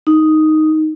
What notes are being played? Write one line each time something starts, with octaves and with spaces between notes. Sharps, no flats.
D#4